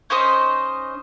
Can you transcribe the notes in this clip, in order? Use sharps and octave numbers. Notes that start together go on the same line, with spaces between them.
C#4 D#4 C5 D#5